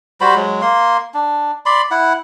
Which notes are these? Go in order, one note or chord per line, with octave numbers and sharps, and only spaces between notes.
G3 F#4 C5 B5
F#3 G#3
A#3 C6
D4
D5 B5 C6
E4 F#5